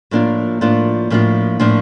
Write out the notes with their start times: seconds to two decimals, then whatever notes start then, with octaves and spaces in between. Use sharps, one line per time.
0.11 A2 F3 A#3 D4 F4
0.61 A2 F3 A#3 D4 F4
1.10 A2 F3 A#3 D4 F4
1.60 A2 F3 A#3 D4 F4